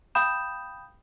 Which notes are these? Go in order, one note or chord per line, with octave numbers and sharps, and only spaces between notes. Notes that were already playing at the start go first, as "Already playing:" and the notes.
F5 G5 B5 D#6 G6 E7